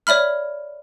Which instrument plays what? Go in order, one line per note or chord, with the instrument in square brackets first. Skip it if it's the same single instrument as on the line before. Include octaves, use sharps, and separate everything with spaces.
[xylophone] C#5 D5 E5 B5 F6